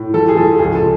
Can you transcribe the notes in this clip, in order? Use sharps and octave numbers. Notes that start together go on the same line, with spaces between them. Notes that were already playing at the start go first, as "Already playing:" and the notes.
Already playing: A2
F3 A4
G#4
F3 A4
C#2 G#4
A4